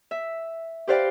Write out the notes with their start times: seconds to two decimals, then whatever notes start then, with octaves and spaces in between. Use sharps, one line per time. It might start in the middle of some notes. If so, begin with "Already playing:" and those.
0.11 E5
0.87 G4 B4 C5 D5 F5 G5